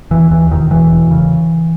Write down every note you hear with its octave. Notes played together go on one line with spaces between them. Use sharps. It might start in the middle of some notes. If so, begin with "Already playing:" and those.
E1 E3
D#2 E3
E1 D#3
E1 E3
E1
C#3